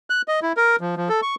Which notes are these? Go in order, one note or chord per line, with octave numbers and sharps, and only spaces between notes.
F#6
D#5
E4
A#4
F3
F3
A4
C#6